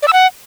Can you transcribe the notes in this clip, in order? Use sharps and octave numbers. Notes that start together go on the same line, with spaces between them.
D5
E6
F#5